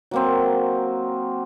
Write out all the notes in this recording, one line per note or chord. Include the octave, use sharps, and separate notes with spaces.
F#3 A#3 C4